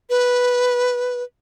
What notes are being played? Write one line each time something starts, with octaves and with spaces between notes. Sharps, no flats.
B4